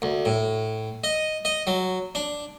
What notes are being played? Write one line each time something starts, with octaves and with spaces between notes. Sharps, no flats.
D2
A2
D#5
D#5
F#3
D4